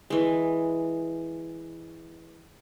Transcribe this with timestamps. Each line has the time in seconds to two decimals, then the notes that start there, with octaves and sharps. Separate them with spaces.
0.10 E3 G#3